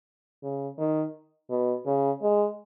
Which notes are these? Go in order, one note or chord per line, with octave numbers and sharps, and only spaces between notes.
C#3
D#3
B2
C#3
G#3